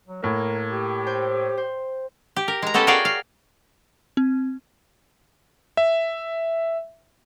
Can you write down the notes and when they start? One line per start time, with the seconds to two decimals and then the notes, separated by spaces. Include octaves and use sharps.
0.08 F#3
0.23 A2 A#3 A#4
0.70 G4
1.07 C5 G5
1.57 C5
2.36 G4
2.48 A#4
2.62 G#3 A#5
2.74 B3 C#4 G4 A4 D#5
2.87 F#4 G#4 A#4 D5 F5 G5
3.05 F5
4.17 C4
5.77 E5